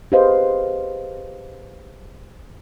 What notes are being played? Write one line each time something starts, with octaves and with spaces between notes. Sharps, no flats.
G4 G#4 B4 C5 D#5 F5